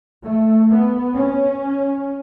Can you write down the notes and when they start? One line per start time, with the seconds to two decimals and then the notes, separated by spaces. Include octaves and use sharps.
0.24 A3
0.70 B3
1.14 C#4